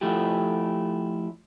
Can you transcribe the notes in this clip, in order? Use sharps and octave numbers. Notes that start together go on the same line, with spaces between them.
F3 A3 E4 F4 G4